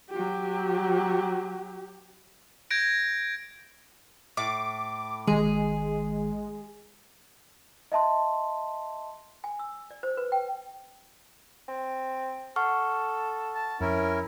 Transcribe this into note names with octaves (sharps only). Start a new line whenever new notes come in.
F#3 G4
G6 G#6 A#6 D7
A2 D6
G#1 D#3 G#3 G#4
D#5 E5 A5 C6
G#5
E6
D5
C5
B4
G5
C4
A4 F#5 C#6 F6
A5
F2 C#4 E4 A#4